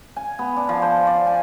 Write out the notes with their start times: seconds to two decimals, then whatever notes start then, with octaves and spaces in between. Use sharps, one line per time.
0.16 G#5
0.39 B3
0.56 D4
0.69 F3
0.82 C5
1.07 D5
1.27 G#5